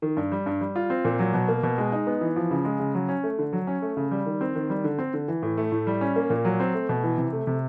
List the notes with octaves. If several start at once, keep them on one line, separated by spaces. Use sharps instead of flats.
D#3
G2
G3
G2
G3
F4
C4
A#2
F#3
B2
A#3
B2
G#3
D#4
B3
E3
F3
C#3
G#3
C#3
F#3
C#4
A3
D3
F#3
C#4
A3
C#3
G3
D#3
C4
D#3
G3
D3
C4
D3
E3
A2
A3
A2
G3
C#4
A#3
A#2
F#3
C4
A3
B2
E3
C3
A3
C3